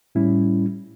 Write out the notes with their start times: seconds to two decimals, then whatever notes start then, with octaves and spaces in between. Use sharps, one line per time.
0.15 A2 G3 C#4 E4